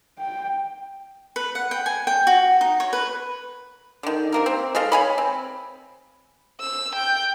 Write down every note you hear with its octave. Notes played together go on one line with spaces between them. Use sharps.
G5
B4
F#5
G5
G#5
G5
F#4
D#4
C#5
B4
D3 D#3
C3 A#3 A#4
C4
G#3 A4 D#5 F5
C#5 G#5 B5
C4
E6
G5